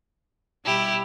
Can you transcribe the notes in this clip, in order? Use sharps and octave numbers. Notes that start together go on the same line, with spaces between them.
B2 G3 E4 G4